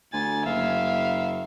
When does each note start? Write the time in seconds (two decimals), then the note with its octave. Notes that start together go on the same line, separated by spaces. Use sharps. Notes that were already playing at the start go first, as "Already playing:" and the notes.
0.13 D2 G#5 A6
0.46 F#1 E5 F5